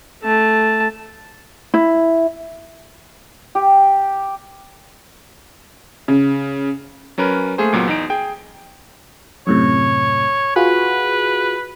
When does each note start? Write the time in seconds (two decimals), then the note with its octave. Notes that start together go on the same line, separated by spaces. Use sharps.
0.23 A3 A5
1.74 E4
3.55 G4
6.08 C#3
7.18 F#3 C#4 A#4 B4
7.58 A3 A#3 G#4 C5
7.73 C#2 A#2 F#3 B3
7.88 E2 D#4 D7
8.10 G#4 G5
9.47 F#2 A2 C3 C#5
10.56 F4 F#4 G#4 B4